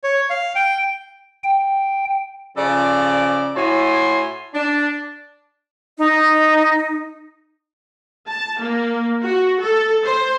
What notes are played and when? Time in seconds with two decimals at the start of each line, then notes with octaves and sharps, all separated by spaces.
0.04 C#5
0.30 F5
0.55 G5
1.44 G5
2.57 C#3 F3 A4 D5
3.55 A2 E4 F#4 C#5 G#5 C6
4.54 D4
5.98 D#4
8.27 A5
8.60 A#3
9.24 F#4
9.62 A4
10.04 C5